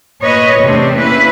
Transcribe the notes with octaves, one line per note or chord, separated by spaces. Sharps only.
A#2 B4 C#5 D#5
E2 C3 A3 C4 D4
A#3 C#4 E4 B4